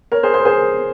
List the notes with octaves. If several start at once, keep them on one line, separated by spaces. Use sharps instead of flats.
A#4 C#5
G#4 C5
G#4 C5
A#4
G#4 C5